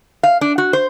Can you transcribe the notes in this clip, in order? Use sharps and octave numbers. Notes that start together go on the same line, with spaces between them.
F5
D4
F#4
C5